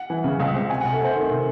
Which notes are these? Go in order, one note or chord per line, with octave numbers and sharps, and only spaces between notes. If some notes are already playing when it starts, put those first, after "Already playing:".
Already playing: F#5
E3
C#3
C#2
C4
C3 G#5
F#5
C3
A4
A3 C5
D#3
C3